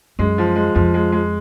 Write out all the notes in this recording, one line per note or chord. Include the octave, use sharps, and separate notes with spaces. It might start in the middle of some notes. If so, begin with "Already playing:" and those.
F#2 G#3
F3
G#3
F2 F3
G#3
G#3